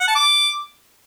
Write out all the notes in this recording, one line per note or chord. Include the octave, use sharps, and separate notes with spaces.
F#5
A5
D6